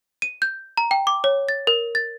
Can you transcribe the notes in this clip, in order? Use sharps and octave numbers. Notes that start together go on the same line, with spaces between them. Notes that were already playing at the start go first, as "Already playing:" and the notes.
D#7
G6
A#5
G5
D6
C#5
A6
A#4
A6